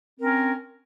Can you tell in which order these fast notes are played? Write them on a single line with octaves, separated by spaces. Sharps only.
C4 A#4 C#4